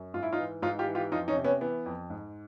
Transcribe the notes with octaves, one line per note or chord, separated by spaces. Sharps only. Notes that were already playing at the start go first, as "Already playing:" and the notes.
Already playing: F#2
G#2 F4
E4
D#4 F4
E3
G#2 D#4 F4
F4 G4
E3
F4 G4
F2 D#4 F4
C#4 D#4
C3
B3 C#4
E3 B3
F2
G#2